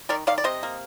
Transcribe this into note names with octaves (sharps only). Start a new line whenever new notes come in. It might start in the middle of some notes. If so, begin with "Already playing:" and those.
D#3 A#4 D5
D#3 D5 F5
D5
C3 C5 D#5
A#3